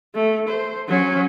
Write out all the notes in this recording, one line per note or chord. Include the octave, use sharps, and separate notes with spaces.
A3
C5
F#3 C#4